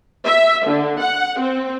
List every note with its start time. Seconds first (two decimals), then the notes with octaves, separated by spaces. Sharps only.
0.25 E5
0.66 D3
1.00 F#5
1.40 C4